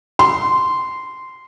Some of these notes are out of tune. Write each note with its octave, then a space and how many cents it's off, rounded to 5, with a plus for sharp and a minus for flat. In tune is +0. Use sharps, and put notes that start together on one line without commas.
C6 -10